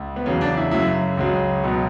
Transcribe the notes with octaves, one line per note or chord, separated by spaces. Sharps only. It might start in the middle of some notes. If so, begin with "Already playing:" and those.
Already playing: C#2
B3
E2 C#3 F#3 C#4
D4
E4
F#2 C#3 F#3 E4
C#2 C#3 F#3
C#2 B2 F#3